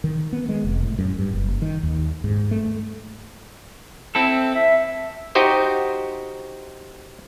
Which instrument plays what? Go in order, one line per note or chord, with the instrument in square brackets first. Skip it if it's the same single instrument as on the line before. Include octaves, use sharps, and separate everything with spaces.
[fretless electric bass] D#3
B3
G#3
F1
A2
F#2
G2
F#1
D#3
D#2
G#2
A3
[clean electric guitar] C4 E4 A4
[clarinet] E5
[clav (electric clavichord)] D#4 F#4 G4 C5 D#5